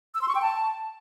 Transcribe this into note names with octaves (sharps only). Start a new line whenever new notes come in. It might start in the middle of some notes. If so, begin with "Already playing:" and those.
E6
C6
C#6
G5
A5